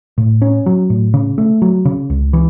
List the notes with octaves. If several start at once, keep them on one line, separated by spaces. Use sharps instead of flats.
A2
C#4
F#3
A2
C#3
A3
F#3
C#3
C#2
E3